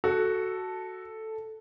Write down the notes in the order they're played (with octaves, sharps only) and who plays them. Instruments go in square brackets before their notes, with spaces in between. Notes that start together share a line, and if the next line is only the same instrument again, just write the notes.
[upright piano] F#4 [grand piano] A4